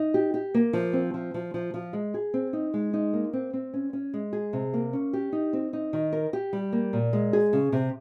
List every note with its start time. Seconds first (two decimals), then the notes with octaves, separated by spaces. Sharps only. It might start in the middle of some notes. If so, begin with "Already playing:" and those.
Already playing: D#4
0.14 G4
0.34 G4
0.54 A#3
0.73 F3
0.93 C4
1.14 F3
1.34 F3
1.54 F3
1.74 F3
1.93 G#3
2.14 G#4
2.34 C4
2.53 D#4
2.74 G#3
2.93 D#4
3.13 A#3
3.33 C4
3.53 C4
3.74 C#4
3.93 C#4
4.14 G#3
4.33 G#4
4.53 C3
4.73 A#3
4.93 C#4
5.13 G4
5.32 D#4
5.53 C4
5.73 D#4
5.93 D#3
6.13 A#4
6.33 G4
6.53 G3
6.72 A#3
6.93 A#2
7.13 G#3
7.33 G#4
7.53 C#3
7.72 C3